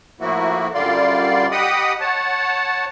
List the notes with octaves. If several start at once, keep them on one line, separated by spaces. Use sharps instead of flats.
A2 F3 A#3 E4 F#4
F#2 D3 G3 F4 D5 C6
G4 D#5 F#5 G5 B5 D#6
C#5 F#5 A5